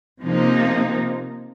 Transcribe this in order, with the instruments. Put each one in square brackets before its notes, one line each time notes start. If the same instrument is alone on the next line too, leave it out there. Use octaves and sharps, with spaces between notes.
[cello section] C3 F3 A#3 D#4